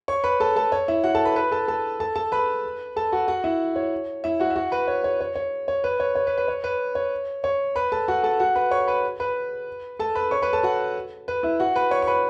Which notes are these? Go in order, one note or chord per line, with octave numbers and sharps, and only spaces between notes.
C#5 C#6
B4 B5
A4 A5
A4 A5
C#5
E4 E5
F#4 F#5
A4 A5
B4 B5
B4 B5
A4 A5
A4 A5
A4 A5
A4 A5
B4 B5
A4 A5
F#4 F#5
F#4 F#5
E4 E5
C#5
E4 E5
F#4 F#5
E5
F#4 F#5
B4 B5
C#5
C#5
C#5
C#5
C#5
B4
C#5
C#5
B4
B4
C#5
B4
C#5
C#5 C#6
B4 B5
A4 A5
F#4 F#5
A4 A5
F#4 F#5
B4 B5
C#5 C#6
B4 B5
B4 B5
A4 A5
B4 B5
C#5 C#6
B4 B5
A4 A5
F#4 F#5
B4
E4 E5
F#4 F#5
B4 B5
C#5 C#6
C#6
B4 B5